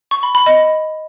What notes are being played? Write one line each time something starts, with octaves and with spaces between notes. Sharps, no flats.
C#6
B5
B5
D#5